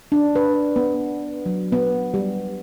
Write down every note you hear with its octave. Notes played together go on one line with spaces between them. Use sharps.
D4
B4
B3
F#3
B3
G3